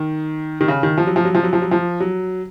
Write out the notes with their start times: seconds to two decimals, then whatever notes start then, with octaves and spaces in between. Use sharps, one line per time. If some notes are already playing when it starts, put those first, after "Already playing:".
Already playing: D#3
0.61 D#3
0.68 C#3
0.83 D#3
0.98 F3
1.07 F#3
1.16 F3
1.25 F#3
1.35 F3
1.43 F#3
1.53 F3
1.62 F#3
1.71 F3
2.00 F#3